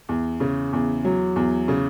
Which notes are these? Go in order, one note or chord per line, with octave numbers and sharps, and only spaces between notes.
E2
C#3
E2
F#3
E2
C#3